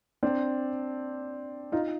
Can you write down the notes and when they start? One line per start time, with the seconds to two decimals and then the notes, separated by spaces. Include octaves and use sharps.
0.23 C4 D4
1.72 D#4 F4